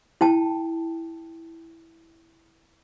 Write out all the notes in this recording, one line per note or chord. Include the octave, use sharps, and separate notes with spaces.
E4 G5 A5